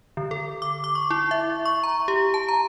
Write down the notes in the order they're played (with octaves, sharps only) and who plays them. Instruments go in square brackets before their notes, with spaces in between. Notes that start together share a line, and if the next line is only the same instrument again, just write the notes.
[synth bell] D3
A4
D6
D6
C#6
E4
E5
C#6
A#5
G4
A5
A#5